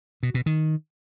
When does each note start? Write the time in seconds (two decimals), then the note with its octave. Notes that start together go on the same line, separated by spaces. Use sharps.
0.23 B2
0.34 B2
0.46 D#3